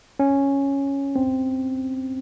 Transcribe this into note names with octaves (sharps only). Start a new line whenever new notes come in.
C#4
C4